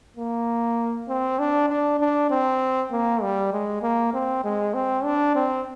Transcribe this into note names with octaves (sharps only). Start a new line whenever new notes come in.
A#3
C4
D4
D4
D4
C4
A#3
G3
G#3
A#3
C4
G#3
C4
D4
C4